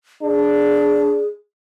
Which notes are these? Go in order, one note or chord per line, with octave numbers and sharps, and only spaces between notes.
D4 G#4